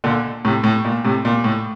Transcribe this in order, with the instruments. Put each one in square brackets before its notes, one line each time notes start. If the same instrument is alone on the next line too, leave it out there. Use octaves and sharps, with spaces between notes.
[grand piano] A#2 D3
A2 C3
A2
A#2
A2 C3
A#2
A2